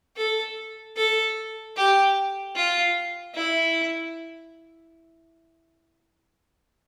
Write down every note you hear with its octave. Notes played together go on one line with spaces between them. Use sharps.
A4
A4
G4
F4
E4